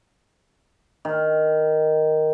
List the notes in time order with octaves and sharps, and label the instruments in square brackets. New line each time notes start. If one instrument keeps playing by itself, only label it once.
[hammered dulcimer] D#3